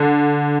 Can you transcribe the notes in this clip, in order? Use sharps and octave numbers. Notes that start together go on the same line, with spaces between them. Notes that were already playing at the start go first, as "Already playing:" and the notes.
Already playing: D3